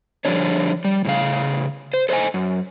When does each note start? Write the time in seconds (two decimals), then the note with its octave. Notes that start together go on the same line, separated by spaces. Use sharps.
0.25 D3 F3 G3 D4 C#5
0.84 G3
1.05 A2 C#3 F5
1.94 C5
2.09 A4 C5 D5 D#5 G#5
2.34 F#2